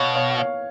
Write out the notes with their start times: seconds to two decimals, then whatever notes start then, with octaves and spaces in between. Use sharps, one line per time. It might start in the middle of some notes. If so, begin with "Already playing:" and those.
Already playing: B2 C#5 F5
0.15 C#5 F5
0.38 C#5 F5